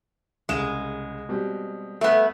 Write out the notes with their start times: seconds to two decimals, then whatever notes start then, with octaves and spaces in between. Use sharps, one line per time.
0.49 C2 C#3 G#3 E7
1.29 B2 G3 C4
2.01 A3 B3